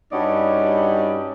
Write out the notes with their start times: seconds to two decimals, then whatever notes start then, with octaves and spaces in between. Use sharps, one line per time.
0.13 G2 G3 C#4 D#4 F#4 D5